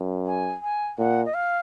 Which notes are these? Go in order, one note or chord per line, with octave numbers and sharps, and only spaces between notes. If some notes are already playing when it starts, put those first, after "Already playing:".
Already playing: F#2
G#5
G#5
A#2 F#5
D#5
F5